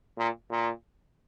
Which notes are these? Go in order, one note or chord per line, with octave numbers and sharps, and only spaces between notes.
A#2
A#2